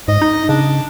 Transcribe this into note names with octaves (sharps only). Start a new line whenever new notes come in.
G#2 D#5
D#4
C#3 D4